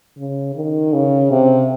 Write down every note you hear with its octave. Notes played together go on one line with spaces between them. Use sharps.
C#3
D#3
C#3
C3